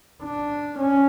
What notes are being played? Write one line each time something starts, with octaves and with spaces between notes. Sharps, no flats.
D4
C#4